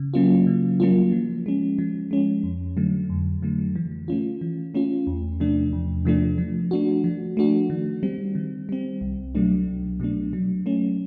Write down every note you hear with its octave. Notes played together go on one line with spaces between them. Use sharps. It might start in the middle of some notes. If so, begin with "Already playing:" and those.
Already playing: C#3
F#3 A#3 C#4 F4
C#3
F#3 A#3 C#4 F4
F3
G#3 C#4
F3
G#3 C#4
F2
D3 F#3 A3
F2
D3 F#3 A3
E3
A3 C#4 F4
E3
A3 C#4 F4
E2
C3 F3 A3 D4
E2
C3 F3 A3 D4
F3
A3 D4 F#4
F3
A3 D4 F#4
D#3
G3 C4
D#3
G3 C4
C2
B2 F#3 A3 D4
C2
B2 F#3 A3 D4
F#3
A3 C#4